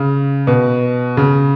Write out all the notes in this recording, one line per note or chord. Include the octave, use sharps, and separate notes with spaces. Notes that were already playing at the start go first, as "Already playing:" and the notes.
Already playing: C#3
B2
C#3